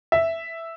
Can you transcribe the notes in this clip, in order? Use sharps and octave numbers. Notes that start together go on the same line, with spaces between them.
E5